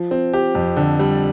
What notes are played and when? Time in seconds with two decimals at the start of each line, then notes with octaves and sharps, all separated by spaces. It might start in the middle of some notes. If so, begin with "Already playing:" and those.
Already playing: F3
0.11 C4
0.33 G4
0.55 F2
0.77 D3
0.99 G3